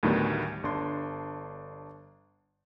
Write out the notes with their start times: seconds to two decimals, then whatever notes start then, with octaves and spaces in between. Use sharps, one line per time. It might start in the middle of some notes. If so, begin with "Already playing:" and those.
0.03 D2 A2 D#3 F#3 G3 B3
0.63 G1 D4 C6